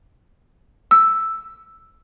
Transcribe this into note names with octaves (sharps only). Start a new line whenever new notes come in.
E6